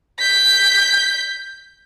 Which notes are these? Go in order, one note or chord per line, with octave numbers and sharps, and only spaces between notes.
G6 B6